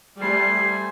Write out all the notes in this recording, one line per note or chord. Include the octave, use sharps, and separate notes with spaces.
G3 A3 C5 G#5 C7